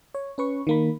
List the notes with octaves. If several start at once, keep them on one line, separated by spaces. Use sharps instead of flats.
C#5
C#4 B4 C#6
D#3 A#3 B5